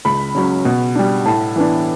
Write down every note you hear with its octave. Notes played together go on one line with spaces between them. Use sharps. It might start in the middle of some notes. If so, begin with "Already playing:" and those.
C#2 B5
C#3 F#3 C#4
B2
G3 D4
A2 A5
E3 B3 D4